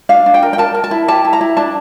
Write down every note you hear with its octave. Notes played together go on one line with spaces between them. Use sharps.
D4 F5
D4
G5
A#4
G5
A#4 A5
A#4
A5
E4
G4 A5
E4
A#5
E4
D4 A5